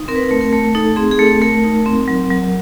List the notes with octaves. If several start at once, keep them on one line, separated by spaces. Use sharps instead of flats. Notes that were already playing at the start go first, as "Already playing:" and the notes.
Already playing: D#4
C4 A#4
B4
A#4
A3
A#4
A3
D#4 A4
C4 G#4
G#4
A3 A4
A3 A#4
D#4
C4
F#3
F#3